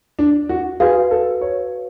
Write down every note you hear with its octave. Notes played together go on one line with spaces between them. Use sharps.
D4
F#4
F#4 G#4 B4 F5
A4
C#5